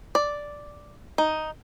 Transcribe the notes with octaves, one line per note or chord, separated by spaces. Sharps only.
D5
D#4